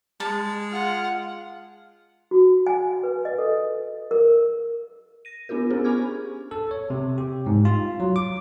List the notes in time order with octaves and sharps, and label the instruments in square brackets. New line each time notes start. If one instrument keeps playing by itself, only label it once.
[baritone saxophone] G#3 [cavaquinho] A5
[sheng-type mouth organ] F4 F6 [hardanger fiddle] F#5
[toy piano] F#4
G#5
B4
D#5
A4
A#4
[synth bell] A#6 D#7
B3 D4 F4 G4 A#4
B3 C#4 D4 G4 G#4 C5
G#5 B5 C#6 D6 F6 G#6
[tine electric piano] A4
C#5
C3
G4
G#2
F4
F#3
D6